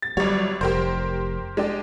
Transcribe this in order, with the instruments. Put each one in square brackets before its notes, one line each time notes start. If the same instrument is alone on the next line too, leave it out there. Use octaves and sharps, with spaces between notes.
[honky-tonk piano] A6
[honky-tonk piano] G1 C#5 [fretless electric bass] F#3 G3
[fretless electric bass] F1 [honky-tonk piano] G4 A#4 C5
[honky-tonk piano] G#3 D4 G4